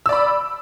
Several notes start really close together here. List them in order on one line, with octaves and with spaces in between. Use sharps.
E6 D5 B5